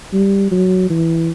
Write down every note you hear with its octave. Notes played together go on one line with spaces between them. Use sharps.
G3
F#3
E3